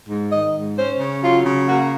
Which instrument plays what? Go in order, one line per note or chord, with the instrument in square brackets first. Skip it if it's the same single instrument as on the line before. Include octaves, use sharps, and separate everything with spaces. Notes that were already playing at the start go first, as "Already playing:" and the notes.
[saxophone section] G#2
D#3 D#5
G#2
C#4 C5
C#3
F#3 F4
C#3
A#3 F#4